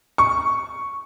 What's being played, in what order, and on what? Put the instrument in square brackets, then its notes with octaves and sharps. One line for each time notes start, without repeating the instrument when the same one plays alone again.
[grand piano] C#6